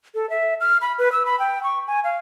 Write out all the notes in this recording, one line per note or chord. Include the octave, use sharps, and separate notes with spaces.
A4
E5
F6
B5
B4
E6
B5
G5
C#6
G#5
F5